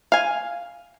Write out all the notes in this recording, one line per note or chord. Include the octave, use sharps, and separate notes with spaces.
F5 G#5